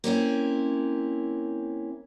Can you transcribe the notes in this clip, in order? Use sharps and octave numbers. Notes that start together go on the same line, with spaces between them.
A#3 C4 C#4 E4